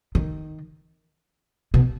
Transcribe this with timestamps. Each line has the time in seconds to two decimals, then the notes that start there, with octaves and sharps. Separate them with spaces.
0.15 D#3
1.74 B2